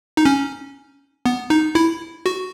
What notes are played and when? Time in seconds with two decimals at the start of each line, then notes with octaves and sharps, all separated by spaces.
0.17 D#4
0.25 C#4
1.26 B3
1.50 D#4
1.75 E4
2.26 F#4